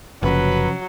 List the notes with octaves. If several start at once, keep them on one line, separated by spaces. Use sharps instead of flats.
F#1 C3 F3 F#3 C#4 B4